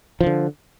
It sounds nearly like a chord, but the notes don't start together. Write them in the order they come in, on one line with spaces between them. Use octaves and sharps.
F3 D#3 D3